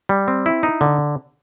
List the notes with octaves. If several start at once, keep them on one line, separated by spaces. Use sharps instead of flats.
G3
C4
E4
D#4
D3